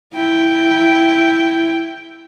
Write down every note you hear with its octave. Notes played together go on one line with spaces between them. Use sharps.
E4 G5